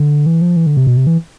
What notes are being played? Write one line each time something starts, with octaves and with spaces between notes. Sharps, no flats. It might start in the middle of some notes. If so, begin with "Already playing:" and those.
Already playing: D3
E3
F3
E3
D3
C3
B2
C3
E3